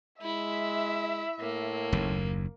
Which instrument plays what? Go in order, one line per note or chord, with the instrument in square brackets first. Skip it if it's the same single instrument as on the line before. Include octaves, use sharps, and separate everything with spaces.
[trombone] G#3 [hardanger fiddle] E4 [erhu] E5
[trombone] A2 [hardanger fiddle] A#3
[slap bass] F#1 D#2